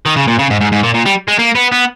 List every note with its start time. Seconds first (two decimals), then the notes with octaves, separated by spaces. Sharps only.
0.06 D#3
0.16 C#3
0.28 A#2
0.39 C#3
0.50 G#2
0.61 G#2
0.72 G#2
0.83 A#2
0.94 A#2
1.06 G3
1.28 G#3
1.39 A#3
1.55 B3
1.72 B3